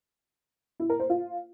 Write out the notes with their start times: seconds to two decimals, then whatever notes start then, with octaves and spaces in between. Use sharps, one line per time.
0.80 E4
0.90 A#4
1.00 C5
1.10 F4